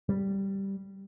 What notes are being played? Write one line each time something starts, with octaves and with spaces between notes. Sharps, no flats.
G3